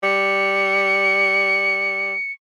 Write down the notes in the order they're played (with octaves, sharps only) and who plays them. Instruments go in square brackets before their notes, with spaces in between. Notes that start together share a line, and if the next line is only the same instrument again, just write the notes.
[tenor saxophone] G3 [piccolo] C#7